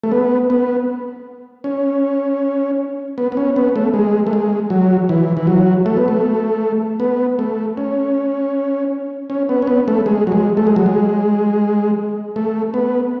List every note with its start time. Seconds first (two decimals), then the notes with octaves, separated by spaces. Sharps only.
0.03 A3
0.12 B3
0.50 B3
1.64 C#4
3.18 B3
3.32 B3
3.37 C#4
3.56 B3
3.76 A3
3.94 G#3
4.27 A3
4.33 G#3
4.70 F#3
5.09 E3
5.37 E3
5.47 F#3
5.86 A3
5.97 B3
6.08 A3
7.00 B3
7.39 A3
7.77 C#4
9.30 C#4
9.49 B3
9.62 C#4
9.67 B3
9.88 A3
10.06 G#3
10.27 F#3
10.32 G#3
10.57 A3
10.67 G#3
10.76 F#3
10.86 G#3
12.36 A3
12.74 B3